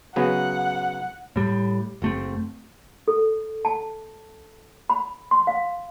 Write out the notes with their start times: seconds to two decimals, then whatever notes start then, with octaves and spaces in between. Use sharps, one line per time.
0.16 C#3 F#3 B3 F#5
1.36 A2 G3
2.02 F#1 A3 C4
3.08 A4
3.65 A5
4.90 B5
5.31 C6
5.47 F5